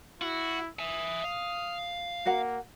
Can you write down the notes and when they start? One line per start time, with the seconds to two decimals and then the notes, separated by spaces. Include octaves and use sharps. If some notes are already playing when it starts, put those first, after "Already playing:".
0.22 E4 F#4
0.79 E5 G#5 D#6
1.24 F5
2.25 A#3 F#4 A#4 F#5